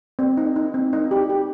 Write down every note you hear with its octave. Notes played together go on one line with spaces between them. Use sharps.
C4
D#4
D#4
C4
D#4
G4
G4